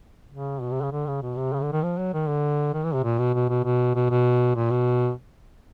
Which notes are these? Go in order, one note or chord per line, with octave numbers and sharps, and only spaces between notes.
C#3
B2
C3
C#3
D3
C#3
B2
C3
C#3
D3
D#3
F3
F#3
D#3
D3
D#3
E3
C3
A#2
B2
B2
B2
B2
B2
B2
A#2
B2